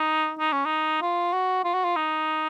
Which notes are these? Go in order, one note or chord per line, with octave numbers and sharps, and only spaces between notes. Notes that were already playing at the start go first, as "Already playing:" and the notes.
Already playing: D#4
D#4
C#4
D#4
F4
F#4
F4
F#4
F4
D#4